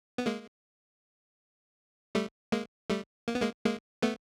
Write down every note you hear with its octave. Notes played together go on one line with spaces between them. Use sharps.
B3
G#3 A#3
G3 A3
G#3 A#3
G3 A3
A#3
B3
G#3 A#3
G#3 A#3
A3 B3